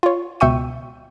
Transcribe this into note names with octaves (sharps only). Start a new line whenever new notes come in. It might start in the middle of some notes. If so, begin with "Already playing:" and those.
F4 C#5
C#2 B2 E5 G5 C#6 D#7